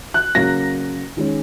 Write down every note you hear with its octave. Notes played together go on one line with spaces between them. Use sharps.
F#6
C#3 F#3 A#3 A#6
D#3 G#3 C#4